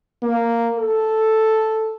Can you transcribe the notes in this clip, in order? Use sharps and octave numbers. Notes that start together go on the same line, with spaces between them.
A#3
A4